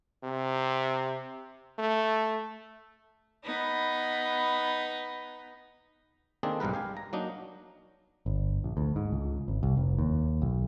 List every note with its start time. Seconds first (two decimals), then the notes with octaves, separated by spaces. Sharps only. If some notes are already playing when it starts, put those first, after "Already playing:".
0.23 C3
1.79 A3
3.46 B3 D#4 B4
6.43 D#3 A#3 C4 D4 G#4 A4
6.60 B1 G#2 G3 A#4 B4
6.74 G4 F5 G#5
6.97 A#5
7.13 F#3 A#3 D4 D#4
8.26 G1
8.64 A#1
8.77 D2
8.96 G#2
9.12 C#2
9.48 G#1
9.63 C2
9.77 F1
9.98 D#2
10.42 B1